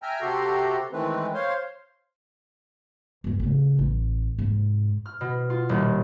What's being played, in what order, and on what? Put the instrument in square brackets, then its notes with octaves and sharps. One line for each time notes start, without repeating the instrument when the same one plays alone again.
[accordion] E5 G5 G#5 A#5 F6
C3 F#4 G4 A4 A#5 C6
D#3 E3 G#3 A3 C4 B4
C5 C#5 F5 C6
[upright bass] G1 D#2
A2 C#3
A1
G#2 C3
[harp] F6
B2
F4
D#1